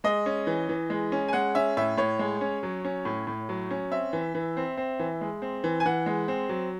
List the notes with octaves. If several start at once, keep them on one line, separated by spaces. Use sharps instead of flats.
G#3 D#5
C#4
E3
E3
G#3
C#4
G#5
G#3 F#5
C#4 E5
A2 E5
A2 C#5
G#3
C#4
F#3
C#4
A2
A2
F#3
C#4
C4 E5
E3
E3
C4
C4
E3
G#3
C4
E3
G#5
E3 F#5
G#3
C4
F#3